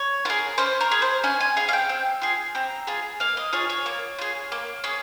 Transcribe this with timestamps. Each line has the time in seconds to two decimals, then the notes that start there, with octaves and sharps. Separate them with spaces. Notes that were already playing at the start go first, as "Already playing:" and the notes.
Already playing: C#5
0.25 F4 G#4 A#4
0.58 C#4 C5
0.81 A#4
0.91 G#4
1.02 C5
1.24 C#4 G#5
1.40 G#5
1.57 G#4 F5
1.69 F5
1.73 G5
1.89 C4
2.22 F4 G#4
2.55 C4 A#5
2.87 F4 G#4
3.20 A#3 F5
3.37 D#5
3.53 F4 G#4 C#5
3.70 C#5
3.86 A#3
4.18 F4 G#4
4.52 A#3
4.84 C#4 G#4